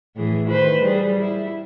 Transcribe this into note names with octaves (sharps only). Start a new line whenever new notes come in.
A2 E3 G#4
D#3 B4 C5
G3 G#4
E4